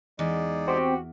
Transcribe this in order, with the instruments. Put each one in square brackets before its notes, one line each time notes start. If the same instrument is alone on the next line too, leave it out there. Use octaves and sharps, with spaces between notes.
[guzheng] E2 [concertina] G#3 D#4 D5
[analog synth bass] C4 [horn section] F#4 G4